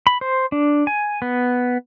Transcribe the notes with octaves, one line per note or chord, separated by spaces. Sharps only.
B5
C5
D4
G#5
B3